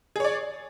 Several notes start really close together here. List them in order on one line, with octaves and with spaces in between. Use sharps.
G#4 C#5 D5